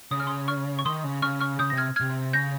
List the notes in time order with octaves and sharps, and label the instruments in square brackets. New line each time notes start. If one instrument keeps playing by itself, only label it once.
[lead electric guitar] C#3 [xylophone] D#6
[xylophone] F6
C6 D#6
C#6 F6
C#6
[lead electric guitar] D#3 [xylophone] C6 D#6
[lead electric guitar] C#3
[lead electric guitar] C#3 [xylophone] C#6 F6
[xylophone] C#6 F6
[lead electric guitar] C#3 [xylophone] D#6 G6
[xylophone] A#6
[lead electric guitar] C3 [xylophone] F6 G#6
[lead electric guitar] C3 [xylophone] F6 G#6
[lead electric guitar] C#3 [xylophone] G6 A#6